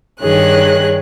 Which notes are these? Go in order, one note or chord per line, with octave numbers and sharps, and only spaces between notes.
G2 D#3 G#4 C#5 F#6